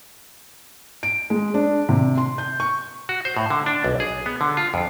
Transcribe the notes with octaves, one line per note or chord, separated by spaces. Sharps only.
D7
G#3
D4
C3
C6
G6
C#6
F#4
C5
A2
D3
D4
B1
G#4
B3
D3
F4
F2